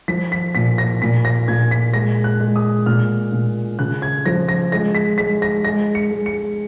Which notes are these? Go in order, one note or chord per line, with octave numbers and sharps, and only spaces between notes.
F3 B6
B6
A#2 B6
A#6
A#2 B6
A#6
A#2 G#6
B6
G#3 A#6
F#6
G#3
D#6
A#2 F6
A#2
C#3 F#6
G#6
F3 A#6
A#6
G#3 A#6
B6
G#3 B6
A#6
G#3 A#6
C#7
G#3
C#7